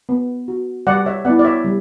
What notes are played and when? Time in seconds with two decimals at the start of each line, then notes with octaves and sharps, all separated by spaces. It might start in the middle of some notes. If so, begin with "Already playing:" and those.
0.09 B3
0.48 F#4
0.87 G3 D5 F#5
1.06 C#5 E5
1.25 B3 E4 D5 F#5
1.39 D5
1.45 C#5 E5
1.65 G3